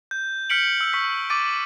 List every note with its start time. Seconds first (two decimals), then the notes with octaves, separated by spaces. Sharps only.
0.11 G6
0.50 F6 G6 B6 C#7 D7 F#7
0.81 E6 C#7
0.93 C#6 B6
1.30 D6 A6 D7 D#7